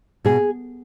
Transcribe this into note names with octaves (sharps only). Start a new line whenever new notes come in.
B2 G#4